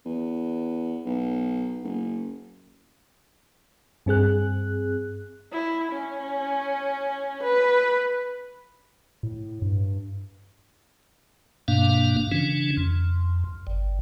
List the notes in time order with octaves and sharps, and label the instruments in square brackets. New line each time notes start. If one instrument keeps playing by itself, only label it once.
[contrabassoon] E2
B1
F#1
[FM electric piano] G2 C4 G#4 F#6
[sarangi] E4
C#4
B4
[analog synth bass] A2
G2
[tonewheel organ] G2 B2 A#3 D4 F5
C#3 E3 C#4 D4
F2
G1